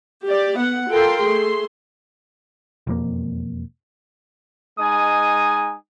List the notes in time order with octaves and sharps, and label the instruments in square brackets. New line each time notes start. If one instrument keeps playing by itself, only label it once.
[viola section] G4 D5
B3 F#5
F4 A4 A#4 G5 C6
A3 G#4 C6
[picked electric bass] E1 F2 A#3
[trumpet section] G#3 D#4 G#5 D#6